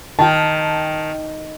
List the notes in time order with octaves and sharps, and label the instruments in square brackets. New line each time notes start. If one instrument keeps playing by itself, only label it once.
[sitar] D#3 [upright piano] G5 A5